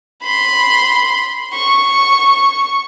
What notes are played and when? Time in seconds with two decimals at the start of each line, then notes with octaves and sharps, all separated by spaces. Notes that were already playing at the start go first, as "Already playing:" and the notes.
0.23 B5 C6
1.54 C#6